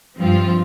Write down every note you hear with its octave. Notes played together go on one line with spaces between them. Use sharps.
G2 F3 C4 F4